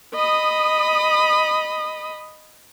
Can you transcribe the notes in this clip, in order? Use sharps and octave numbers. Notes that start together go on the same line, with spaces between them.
D#5 B5 D#6